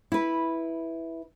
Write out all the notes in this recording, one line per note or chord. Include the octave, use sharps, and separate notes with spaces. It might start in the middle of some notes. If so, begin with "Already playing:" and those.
E4 B4